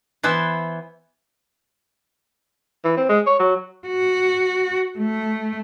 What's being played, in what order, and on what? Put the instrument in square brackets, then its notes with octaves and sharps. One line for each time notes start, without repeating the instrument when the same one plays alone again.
[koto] E3 B3 E4 C5
[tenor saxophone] E3
C4
G#3
C#5
F#3
[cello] F#4
A3